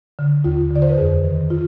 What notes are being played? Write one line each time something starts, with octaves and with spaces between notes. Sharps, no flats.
D3
D#2 F4
D3 D5
C5
B4
F2 G#4
D#3
F4